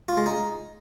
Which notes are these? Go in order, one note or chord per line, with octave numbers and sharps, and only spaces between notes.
F4
G#3
D#4